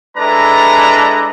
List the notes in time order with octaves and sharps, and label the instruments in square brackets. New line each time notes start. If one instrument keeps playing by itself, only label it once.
[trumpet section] G#3 D4 E4 A4 B4 A#5